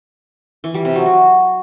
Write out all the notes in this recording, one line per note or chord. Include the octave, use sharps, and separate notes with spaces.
E3
G3
C3
F#3
F#4